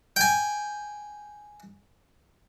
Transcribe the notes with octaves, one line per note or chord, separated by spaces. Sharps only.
G5 G#5